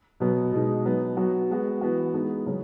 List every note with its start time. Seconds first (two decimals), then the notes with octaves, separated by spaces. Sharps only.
0.20 B2 F#3 B3
0.52 B2 G#3 D#4
0.85 F#3 B3 D#4
1.17 F#3 B3 F#4
1.50 G#3 B3 F#4
1.81 E3 B3 F#4
2.14 G#3 B3 D#4 G#4
2.46 C#3 F#3 C#4